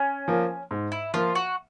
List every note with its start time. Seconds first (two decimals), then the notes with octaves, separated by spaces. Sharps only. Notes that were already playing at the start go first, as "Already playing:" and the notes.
Already playing: C#4
0.28 F3 A#3
0.71 G#2
0.92 E4
1.14 F3 A#3 F4
1.35 F#4